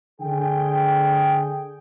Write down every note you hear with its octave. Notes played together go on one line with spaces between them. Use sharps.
D3 G#4 G5